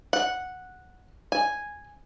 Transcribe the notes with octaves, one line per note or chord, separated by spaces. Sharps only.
F#5
G#5